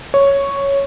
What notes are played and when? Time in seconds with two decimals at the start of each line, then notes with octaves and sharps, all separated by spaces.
0.14 C#5